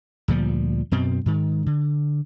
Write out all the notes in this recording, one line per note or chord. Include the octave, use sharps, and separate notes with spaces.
D2 A#2 F3 G3
F#2 B2 C4
G#2 D#3
D3